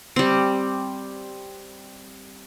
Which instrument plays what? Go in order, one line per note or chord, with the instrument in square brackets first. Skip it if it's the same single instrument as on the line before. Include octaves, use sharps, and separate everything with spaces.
[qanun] G3 C4